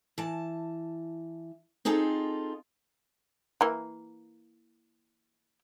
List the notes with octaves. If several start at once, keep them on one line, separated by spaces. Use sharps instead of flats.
E3 A5
C4 D#4 F4 G#4 A4
E3 A#3